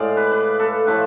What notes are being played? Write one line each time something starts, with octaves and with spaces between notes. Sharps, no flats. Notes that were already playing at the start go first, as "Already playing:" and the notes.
Already playing: A2 G#3 D5 F5
B4
B4
A4
A2 F3 A3 B4